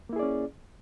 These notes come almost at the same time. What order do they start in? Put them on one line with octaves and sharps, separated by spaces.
A#3 E4 G#4 D5 C#4